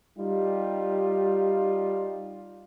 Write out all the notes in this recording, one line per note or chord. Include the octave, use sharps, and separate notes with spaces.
G3 D#4 F4 G4